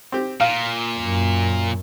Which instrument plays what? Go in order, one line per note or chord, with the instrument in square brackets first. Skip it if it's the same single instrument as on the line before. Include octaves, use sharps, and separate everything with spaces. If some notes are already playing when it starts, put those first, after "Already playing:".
[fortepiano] C4 G4
[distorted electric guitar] A#2 [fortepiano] F5
[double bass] F#2